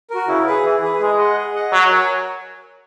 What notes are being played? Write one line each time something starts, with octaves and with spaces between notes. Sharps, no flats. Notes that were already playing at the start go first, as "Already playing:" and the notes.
F#4 A#4
C#3 E4
G#4 B4
E3 E4
G#4 B4
G#3 G#4
D#5 F#5
G#4
D#5 F#5
F#3 F#4
A#4 C#5 G#5